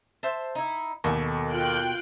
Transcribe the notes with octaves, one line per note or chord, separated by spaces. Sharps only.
C5 E5 A5
D#4 E4
D#2 B2 A4 G#5
F4 G5 F#6